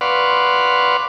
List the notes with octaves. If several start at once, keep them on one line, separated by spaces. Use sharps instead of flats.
B4 D5 F5 F#5 C6 C#6